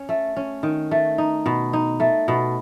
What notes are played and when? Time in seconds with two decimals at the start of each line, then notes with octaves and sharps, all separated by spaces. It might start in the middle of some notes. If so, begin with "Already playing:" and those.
Already playing: C#4
0.09 A3
0.36 C#4
0.63 D#3
0.91 A3
1.18 D#4
1.46 B2
1.73 D#4
2.00 A3
2.28 B2